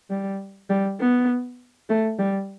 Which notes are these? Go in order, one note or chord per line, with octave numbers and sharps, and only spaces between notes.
G3
G3
B3
A3
G3